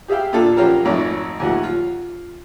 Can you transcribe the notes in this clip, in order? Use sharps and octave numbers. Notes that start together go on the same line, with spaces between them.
G4 G#4 E5 F5 G5
A#2 D4 F4 A4
F3 F#3 C#4 F4 G4 A#4
G#1 F2 G#2 A3 C#5
D#2 F3 F#3 A3 F#5
F4